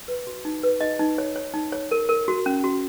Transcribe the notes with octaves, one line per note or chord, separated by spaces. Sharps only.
B4
F#4
D#4
B4
D#4 D#5
D#4
C#5
C#5
D#4
C#5
A#4
A#4
F#4
C#4
F#4